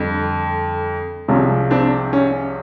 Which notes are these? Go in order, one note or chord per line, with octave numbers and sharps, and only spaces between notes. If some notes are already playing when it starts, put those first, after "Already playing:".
Already playing: F2 D3 G3
C2 C3 F3 G#3 C#4
C4 D4
C#4